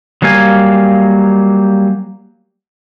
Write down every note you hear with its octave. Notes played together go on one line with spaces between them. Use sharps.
F#3 G3 A#3 F5 G#5